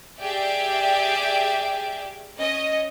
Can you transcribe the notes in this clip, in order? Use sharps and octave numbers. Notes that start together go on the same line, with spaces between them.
G4 G#4 D5 E5 G5 D6
C#4 D#5